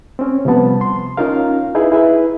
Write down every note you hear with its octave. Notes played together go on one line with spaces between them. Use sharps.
C4 C#4
C3 F3 G3 B3 A5
C6
C#4 D#4 F4 A#4 F5
D#4 E4 G#4 B4
E4 G#4 B4 E5